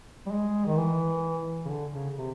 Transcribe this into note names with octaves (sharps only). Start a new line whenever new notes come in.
G3
G#3
D#3
E3
C#3
D3
C#3
C3